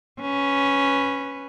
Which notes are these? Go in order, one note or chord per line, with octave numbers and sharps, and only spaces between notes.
C#4 B4